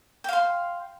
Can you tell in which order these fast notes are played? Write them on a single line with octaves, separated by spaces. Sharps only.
G5 F5 C6